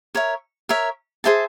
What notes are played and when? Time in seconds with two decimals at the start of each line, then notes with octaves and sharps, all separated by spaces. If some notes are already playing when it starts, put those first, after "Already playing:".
0.15 A#4 C#5 E5
0.69 A#4 C#5 E5
1.24 G#4 C5 E5 A5